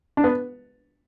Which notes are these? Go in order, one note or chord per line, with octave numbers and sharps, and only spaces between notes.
D4
B3